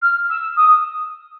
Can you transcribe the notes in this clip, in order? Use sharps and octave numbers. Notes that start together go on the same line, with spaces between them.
F6
E6
D#6